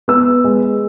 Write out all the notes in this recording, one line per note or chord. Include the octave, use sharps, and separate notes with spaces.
B3 E6
G#3